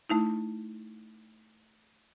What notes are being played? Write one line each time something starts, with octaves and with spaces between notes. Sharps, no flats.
A3 D#4 E4